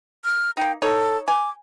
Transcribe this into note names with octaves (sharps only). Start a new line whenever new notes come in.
F6
A#3 D#4 G5
D#4 A4 C#5
G#5 D6